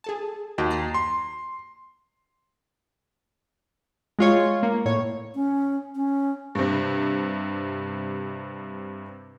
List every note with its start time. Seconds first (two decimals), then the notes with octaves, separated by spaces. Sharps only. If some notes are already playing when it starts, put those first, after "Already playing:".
0.04 G#4 A4 A5
0.58 D#2 F#4 D#5 G5
0.70 A#5 C7
0.94 C6
4.19 G#3 F4 C#5
4.63 A#3
4.85 A2 C#5
5.35 C#4
5.95 C#4
6.55 G2 C3